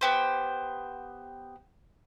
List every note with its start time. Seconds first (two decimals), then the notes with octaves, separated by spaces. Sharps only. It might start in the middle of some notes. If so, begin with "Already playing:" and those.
0.01 B3 G4 C5